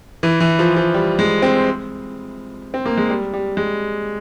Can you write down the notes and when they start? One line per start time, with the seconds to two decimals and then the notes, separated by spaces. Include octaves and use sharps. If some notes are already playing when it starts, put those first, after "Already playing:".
0.23 E3
0.40 E3
0.59 F3
0.76 F3
0.94 G3
1.19 G#3
1.42 C4
2.74 C4
2.86 A#3
2.97 G#3
3.10 G3
3.34 G3
3.57 G#3